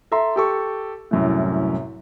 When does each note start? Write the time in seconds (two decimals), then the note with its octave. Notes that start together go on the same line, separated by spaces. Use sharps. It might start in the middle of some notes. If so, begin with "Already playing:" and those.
0.11 A4 E5 A#5 C6
0.36 G4 A4 C#6
1.11 C2 F#2 A2